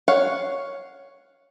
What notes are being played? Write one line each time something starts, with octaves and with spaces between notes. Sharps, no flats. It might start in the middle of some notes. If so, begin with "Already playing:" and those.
C#5 F5 F#5